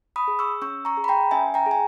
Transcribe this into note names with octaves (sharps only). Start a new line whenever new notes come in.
B5 D#6
G#4
C#6 E6
C#4 C#6 E6
A#5 C#6
G#4
B5
G5 A#5
C#4 E5 G#5
G5 A#5
G#4
G#5